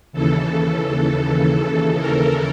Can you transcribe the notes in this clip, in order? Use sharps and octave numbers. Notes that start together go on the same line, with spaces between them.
D#2 C#3 E3 A4
A4
A#4